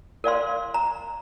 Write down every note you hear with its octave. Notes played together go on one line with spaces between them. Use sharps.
A#4 D5 F5 C6
A#5